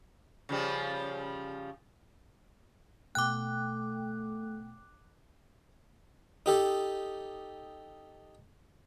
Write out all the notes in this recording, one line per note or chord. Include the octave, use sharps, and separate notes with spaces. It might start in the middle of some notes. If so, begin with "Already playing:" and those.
C#3 F3 G3
B2 A3 G5 D6 F#6
D#4 G4 A4